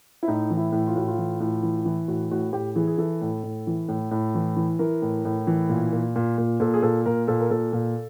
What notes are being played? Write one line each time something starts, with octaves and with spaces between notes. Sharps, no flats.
E4
A2 D#4
E3
E4
A2
F4
A2 F#4
F4
E3
A2
E3
E3
A2 F#4
A2 F#4
A2 G4
E3 G#4
G#4
E3 A4
A2
A2
E3
A2
A2
E3
E3
E3 A#4
A2
A2
E3
A#2
A#2
A#2
A#2
A#2 A4
G#4
A#2 A4
A#2 A#4
A#2 A4
A#4
A#2 A4
A#2